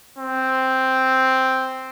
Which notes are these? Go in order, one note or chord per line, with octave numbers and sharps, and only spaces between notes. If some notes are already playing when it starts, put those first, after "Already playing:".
C4